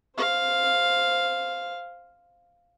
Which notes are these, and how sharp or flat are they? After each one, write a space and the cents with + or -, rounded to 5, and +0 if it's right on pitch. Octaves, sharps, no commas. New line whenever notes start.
C5 +0 F5 +0